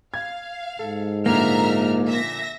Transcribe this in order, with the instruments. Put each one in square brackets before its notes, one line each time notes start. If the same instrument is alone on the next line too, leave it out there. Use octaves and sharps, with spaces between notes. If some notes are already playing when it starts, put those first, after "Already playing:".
[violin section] F5 [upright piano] G#6
[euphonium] G#2 [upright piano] A4
[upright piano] A#2 D3 F3 [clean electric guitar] A#3 [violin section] E5 A#5 F6
[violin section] E5 A#6